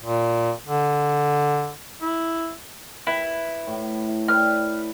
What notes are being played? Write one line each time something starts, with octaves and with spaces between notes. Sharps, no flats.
A#2
D3
E4
E4 B4
A2
B4 D5 G5 F6